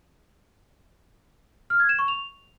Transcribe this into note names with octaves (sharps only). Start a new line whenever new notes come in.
F6
G#6
E7
C#6
F7